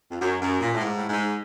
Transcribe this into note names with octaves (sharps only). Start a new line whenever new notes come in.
F2
F#2
F#2
A#2
A2
G#2
A2
G#2